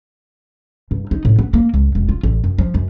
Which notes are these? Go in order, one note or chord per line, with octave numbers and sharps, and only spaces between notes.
G2
D#4
A2
B3
A#3
C#2
E1
F4
A1
F#2
F3
F#2